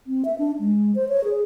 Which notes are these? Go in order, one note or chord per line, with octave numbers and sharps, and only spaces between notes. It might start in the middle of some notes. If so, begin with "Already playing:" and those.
C4
E5
D4
G#3
C5
C#5
G#4